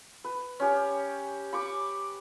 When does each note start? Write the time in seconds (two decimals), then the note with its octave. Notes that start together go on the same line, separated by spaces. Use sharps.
0.24 B4
0.60 C#4 G4
1.53 B5 C#6 D6